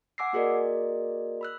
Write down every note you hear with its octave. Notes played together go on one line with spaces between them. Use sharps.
F#5 G#5 D6 E6 A#6 C7
A#3 F#4 G#4 A#4 D5 D#5
B5 E6 F#6